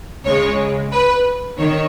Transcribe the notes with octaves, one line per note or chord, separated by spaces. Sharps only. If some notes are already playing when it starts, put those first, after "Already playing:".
C#2 C#3 G#3 C#5
B4
D#3 C#5